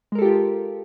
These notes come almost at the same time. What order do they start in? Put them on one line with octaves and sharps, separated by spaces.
G#3 A#4 A4 G4 F4